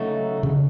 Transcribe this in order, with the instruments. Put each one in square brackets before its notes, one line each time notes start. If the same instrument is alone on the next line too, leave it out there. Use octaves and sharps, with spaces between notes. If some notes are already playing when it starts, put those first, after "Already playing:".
Already playing: [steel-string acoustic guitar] C#3 F#3 A3 D#4 F#4
[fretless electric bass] C#3